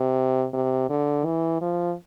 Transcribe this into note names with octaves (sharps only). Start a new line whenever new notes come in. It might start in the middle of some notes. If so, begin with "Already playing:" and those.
Already playing: C3
C3
D3
E3
F3